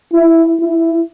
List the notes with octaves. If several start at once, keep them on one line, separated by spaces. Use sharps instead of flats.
E4
E4